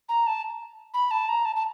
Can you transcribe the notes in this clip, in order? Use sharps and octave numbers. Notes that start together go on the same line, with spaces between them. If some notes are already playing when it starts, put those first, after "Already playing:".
A#5
A5
B5
A5
A#5
A5
A5